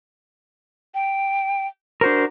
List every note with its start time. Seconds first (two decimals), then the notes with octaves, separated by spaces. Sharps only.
0.94 G5
2.01 D4 F#4 A#4 C5